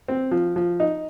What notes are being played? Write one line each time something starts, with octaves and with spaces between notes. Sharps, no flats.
C4
F3
F3
D#4